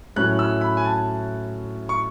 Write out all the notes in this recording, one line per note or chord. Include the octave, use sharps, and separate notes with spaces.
A2 F#3 C#4 E4 F#6
E6
B5
G#5
A5
C#6